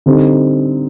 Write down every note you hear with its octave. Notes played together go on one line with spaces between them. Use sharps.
D3 G3 C4 D#4